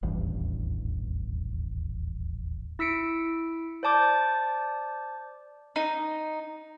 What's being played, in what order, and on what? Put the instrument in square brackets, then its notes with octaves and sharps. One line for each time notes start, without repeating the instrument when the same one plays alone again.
[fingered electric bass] D#1 A1 E2 G2
[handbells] E4 E6 B6 C#7 D7
C5 D5 A5 D6 G6
[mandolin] D#4